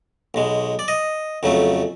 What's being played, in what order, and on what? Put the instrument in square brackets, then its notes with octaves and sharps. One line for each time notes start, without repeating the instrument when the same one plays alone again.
[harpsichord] B1 B2 G#3
D5
D#5
F2 C#3 F#3 A3